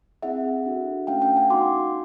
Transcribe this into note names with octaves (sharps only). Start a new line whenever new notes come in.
C4 E4 G#4 E5 F#5
D4 F#4 A4
A3 C#4 E4 A4 F5 G5
F5 G5
F#5 G#5
B3 D#4 F#4 C6 D6